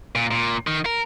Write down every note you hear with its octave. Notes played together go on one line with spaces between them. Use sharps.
A#2
A#2
D#3
A#4